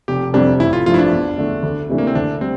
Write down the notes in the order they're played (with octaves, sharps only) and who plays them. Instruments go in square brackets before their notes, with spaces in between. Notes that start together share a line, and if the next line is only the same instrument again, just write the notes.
[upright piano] F1 [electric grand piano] G4
[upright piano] F2 C3 G3 C4 [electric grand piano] D4
[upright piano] A1 [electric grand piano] E4
[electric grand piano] F4
[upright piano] G2 F3 A3 [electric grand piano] F4
[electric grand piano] E4
D4
[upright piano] E2
D3 A3
D2
C3 E3 A3 D4
[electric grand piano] A#3
C4
[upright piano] D2 [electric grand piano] D4
[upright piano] G3 [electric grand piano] C4